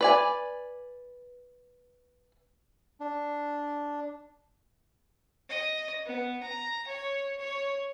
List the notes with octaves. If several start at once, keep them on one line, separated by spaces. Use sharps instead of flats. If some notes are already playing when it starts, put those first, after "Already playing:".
B4 D5 G#5
D4
D#5
B3
A#5
C#5
C#5